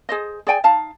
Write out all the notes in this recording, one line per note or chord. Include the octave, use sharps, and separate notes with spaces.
G#4 C5 D#5
G#4 D5 G5 G#5
D#4 F5 A5